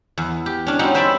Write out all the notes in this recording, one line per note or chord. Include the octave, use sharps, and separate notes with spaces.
E2
G4
C#4 D4
G3 C4 C#4 D#4 F#4
B4 C5 E5 G5 A5 B5